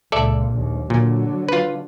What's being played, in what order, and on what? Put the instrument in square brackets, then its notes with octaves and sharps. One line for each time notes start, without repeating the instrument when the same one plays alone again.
[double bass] C#2 A#2 [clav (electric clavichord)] A4 D5 E5
[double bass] A#1 D#2
[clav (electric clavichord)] A#2 [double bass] D3 F#3
[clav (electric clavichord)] F4 B4